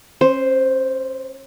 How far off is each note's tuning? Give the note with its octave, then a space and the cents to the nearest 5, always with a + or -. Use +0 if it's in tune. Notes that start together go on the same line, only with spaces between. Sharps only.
C#4 -35 C5 +0